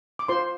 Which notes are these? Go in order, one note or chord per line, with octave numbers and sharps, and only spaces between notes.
D6
F4 C5 C6